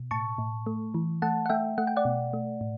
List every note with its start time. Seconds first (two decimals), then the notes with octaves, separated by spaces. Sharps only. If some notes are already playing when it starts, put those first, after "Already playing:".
Already playing: B2
0.11 A2 A5 C#6
0.38 A2
0.66 A3
0.94 E3
1.22 A3 F#5 A5
1.46 F#5
1.50 A3 E5 G5
1.78 A3 F#5
1.87 G5
1.96 D5 F#5
2.05 B2
2.33 A3
2.61 A2